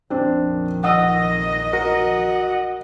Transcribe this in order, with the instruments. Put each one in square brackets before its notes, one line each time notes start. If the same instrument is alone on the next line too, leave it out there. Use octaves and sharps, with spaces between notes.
[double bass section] A#1 F2 D#3 [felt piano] C4 D4
[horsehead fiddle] D#5 [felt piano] F#5 D#6 E6
[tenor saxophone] F#4 [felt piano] A#4